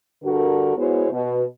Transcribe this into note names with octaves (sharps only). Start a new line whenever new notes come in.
G2 D3 F#4 A4 A#4
G#3 B3 E4 F#4 C5 C#5
B2